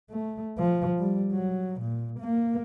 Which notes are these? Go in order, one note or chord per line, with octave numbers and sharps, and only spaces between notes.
A3
F3
G3
F#3
A#2
A#3